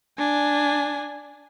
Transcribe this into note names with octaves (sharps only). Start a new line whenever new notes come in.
D4 G#5